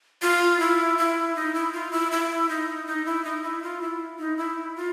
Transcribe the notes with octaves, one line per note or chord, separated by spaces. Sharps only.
F4
E4
E4
D#4
E4
F4
E4
E4
D#4
D#4
E4
D#4
E4
F4
E4
D#4
E4
F4